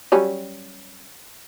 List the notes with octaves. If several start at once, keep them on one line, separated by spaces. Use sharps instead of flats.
F#3 G3 C#4